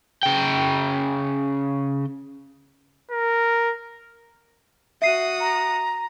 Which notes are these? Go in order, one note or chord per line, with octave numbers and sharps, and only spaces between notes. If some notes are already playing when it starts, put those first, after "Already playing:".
C#3 G5
A#4
F#4 E5 D#6 C7 D#7
A#5